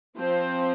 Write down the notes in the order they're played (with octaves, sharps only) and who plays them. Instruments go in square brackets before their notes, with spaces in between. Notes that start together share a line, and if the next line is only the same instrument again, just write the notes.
[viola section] F3 C4 C5